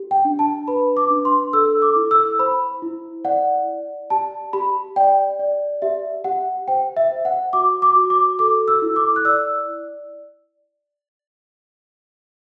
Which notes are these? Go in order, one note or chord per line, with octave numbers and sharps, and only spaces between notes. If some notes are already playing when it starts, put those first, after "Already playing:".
Already playing: G4
G5
D4
A5
B4 B5
D6
D4
C6
A4 E6
D6
E4
E6
C5 B5
E4
D5 F#5
D5
G4 A5
G4 B5
D5 G5
D5
G4 E5
G4 F#5
C5 G5
E5
C5
F#5
F#4 D6
D6
F#4
D6
A4 D6
E6
E4
D6
F#6
D5 E6